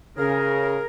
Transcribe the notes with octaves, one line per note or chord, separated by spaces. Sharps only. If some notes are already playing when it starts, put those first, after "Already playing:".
C#3 G#4 A#4